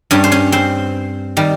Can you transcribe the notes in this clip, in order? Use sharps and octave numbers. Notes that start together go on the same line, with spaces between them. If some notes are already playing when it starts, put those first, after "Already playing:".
G2 G3 C#4 C#5
C5
C#4 C#5
C4 C5
D#3 G3